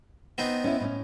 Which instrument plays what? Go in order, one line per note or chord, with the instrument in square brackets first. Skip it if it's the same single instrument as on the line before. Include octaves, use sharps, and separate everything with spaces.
[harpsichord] B3 C4 D#4
[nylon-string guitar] C#4 E4
A2 C#4